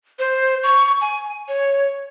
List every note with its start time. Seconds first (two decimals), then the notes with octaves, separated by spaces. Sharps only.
0.19 C5
0.64 C#6
1.01 G#5
1.48 C#5